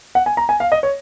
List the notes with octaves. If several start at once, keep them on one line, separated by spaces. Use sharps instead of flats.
F#5
G#5
A#5
G#5
F5
D#5
C#5